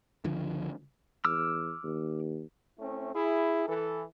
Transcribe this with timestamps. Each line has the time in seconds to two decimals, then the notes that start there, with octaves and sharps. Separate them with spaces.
0.24 C#2 D3 F3
1.25 E2 D6 E6 F6
1.84 D#2
2.78 A3 C4 C#4 E4
3.13 E4 G#4
3.67 E3 A4